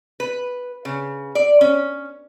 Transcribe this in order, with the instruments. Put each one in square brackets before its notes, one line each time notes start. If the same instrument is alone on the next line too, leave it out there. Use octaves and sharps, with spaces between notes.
[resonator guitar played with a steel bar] B4
C#3
D5
C#4